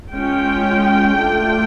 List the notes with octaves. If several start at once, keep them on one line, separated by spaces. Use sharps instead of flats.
G#3 C#4 F4 G5
A3 D4 F4